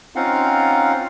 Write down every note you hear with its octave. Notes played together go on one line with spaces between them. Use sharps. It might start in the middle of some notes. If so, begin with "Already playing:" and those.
C4 C#4 D#4 F4 F5 F#5